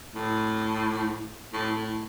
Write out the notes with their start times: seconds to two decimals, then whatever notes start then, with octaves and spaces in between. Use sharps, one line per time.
0.15 A2
1.53 A2
1.76 A2